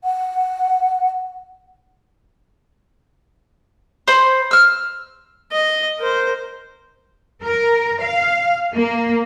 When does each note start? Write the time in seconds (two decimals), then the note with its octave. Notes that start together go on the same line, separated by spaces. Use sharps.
0.04 F#5
4.08 C5 B5
4.51 E6 F6
5.52 D#5
5.99 A#4 C5
7.44 A#4
8.03 F5
8.74 A#3